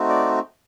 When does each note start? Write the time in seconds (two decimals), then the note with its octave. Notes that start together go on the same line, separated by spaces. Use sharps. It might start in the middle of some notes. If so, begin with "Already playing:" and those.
Already playing: A3 C4 D#4 F#4
0.09 D5